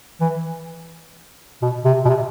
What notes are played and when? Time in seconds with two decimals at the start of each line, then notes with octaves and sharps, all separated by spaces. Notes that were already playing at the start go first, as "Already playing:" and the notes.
0.20 E3
1.62 B2
1.85 C3
2.05 B2
2.09 C3